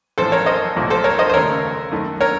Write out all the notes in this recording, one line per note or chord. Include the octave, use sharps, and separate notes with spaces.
A1 A2 F3 A4 C5
A#4 C#5
C5 D#5
C2 A#2 F3 A3
A4 C5
A#4 C#5
C5 D#5
C5
D#2 C#3 A3 A#4 C#5
F#2 D#3 A3
A#4 C#5